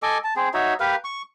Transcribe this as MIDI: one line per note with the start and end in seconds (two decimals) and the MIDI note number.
0.03 0.18 69
0.03 0.18 75
0.03 0.18 80
0.03 0.18 86
0.24 0.34 81
0.36 0.49 60
0.36 0.49 68
0.54 0.74 63
0.54 0.74 66
0.54 0.74 73
0.54 0.74 76
0.80 0.96 67
0.80 0.96 70
0.80 0.96 71
0.80 0.96 77
1.04 1.22 85